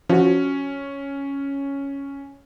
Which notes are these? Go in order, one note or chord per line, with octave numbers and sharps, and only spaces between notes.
F3 C#4 F#4